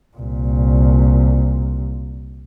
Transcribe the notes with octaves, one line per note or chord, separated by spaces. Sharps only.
C2 A#2